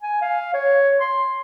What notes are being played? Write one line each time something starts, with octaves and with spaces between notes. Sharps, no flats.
G#5
F5
C#5
C6